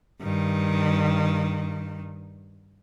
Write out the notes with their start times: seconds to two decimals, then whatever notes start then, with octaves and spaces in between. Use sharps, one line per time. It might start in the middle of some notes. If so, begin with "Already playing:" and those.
0.22 G2 D#3